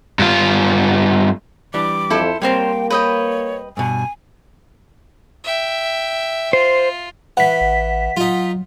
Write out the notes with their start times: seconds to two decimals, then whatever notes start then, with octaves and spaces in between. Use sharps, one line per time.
0.19 G2 F4
1.74 E3 G3 D4 D6
2.10 F2 E4 A4 C5
2.42 G3 A#3 C4 A#4 C5 C#5 G5
2.90 B4 C#5 D#5 G5
3.77 G2 B2 G#5
5.44 E5 G5
6.53 F4 C5
7.37 E3 F#5 B6
7.61 A1
8.17 F#3 D#4 F4